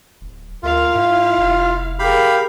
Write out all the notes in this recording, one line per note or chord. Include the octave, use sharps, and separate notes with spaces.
D1
D2 F4 A#4 F5
G#2 E4 F5
F1
G4 G#4 A#4 F5 B5